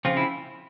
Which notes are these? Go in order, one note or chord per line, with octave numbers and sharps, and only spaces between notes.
C#3 F3 C4 F4
E4